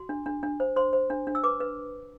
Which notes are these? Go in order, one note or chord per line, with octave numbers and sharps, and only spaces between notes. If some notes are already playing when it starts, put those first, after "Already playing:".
Already playing: F#4 C6
D4
D4
D4
C5
C5 C6
C5
D4
D4
E6
B4 D6
B4